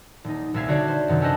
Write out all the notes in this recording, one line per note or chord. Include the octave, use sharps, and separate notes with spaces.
D#1 D#4
D#1 C2 E5 F5 G#6 C7
D3 F#4 C#5 D5 G#6
C5
F#2 C3 D#3
C#4 D4 A4 B4 C5 D#5